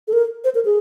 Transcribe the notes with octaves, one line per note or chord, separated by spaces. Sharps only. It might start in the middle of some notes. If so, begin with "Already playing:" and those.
A4
A#4
C5
A#4
G#4